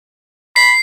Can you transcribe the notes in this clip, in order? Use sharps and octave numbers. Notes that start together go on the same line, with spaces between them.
B5 C7